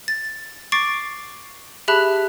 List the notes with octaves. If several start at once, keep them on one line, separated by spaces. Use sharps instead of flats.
A6
C#6 D6 A6 C7 D7
G4 G#4 E5 A5 B5 F#6